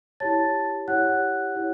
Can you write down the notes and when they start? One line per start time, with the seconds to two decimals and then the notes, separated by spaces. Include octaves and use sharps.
0.20 E4 G4 C#5 A5 A6
0.88 E4 G4 C#5 F#5 F#6
1.55 E4 G4 C#5